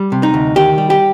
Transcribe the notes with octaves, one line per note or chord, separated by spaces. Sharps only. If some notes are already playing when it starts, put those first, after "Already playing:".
Already playing: G3
C3
D#4
D2
D#3 G4
G3
G4